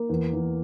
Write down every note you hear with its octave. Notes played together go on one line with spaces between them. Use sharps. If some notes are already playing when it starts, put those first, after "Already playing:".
Already playing: A#3
E2
E2